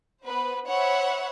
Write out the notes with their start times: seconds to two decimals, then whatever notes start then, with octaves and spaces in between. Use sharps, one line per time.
0.23 B3 B4 C5
0.68 C5 C#5 E5 F#5 B5